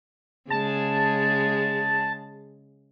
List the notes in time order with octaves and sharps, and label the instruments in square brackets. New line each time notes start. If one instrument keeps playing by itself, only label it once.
[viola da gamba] C#3 G#3 G#4 [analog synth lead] A5